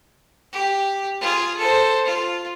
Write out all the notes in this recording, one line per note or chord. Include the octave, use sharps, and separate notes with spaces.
G4
F4 G#4
A4 C5
F4